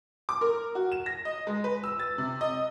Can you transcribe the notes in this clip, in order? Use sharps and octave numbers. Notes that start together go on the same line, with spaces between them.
D6
A#4
F#4
E7
A#6
D#5
G#3
B4
E6
A6
C3
D#5